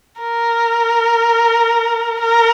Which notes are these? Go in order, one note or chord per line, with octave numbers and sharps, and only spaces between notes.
A#4
A#4